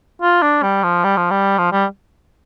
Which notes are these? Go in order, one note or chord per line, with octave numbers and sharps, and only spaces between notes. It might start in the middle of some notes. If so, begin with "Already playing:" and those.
F4
D4
G3
F3
G3
F3
G3
F3
G3